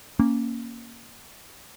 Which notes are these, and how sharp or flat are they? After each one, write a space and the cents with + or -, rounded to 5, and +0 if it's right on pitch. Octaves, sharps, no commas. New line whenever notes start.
A#3 +0 C#4 +0